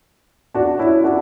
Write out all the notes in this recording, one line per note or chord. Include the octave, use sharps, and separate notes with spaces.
D4 F#4
C#4 E4
D4 F#4